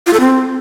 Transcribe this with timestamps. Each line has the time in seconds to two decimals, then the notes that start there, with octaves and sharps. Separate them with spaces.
0.07 F4
0.13 A4
0.20 C4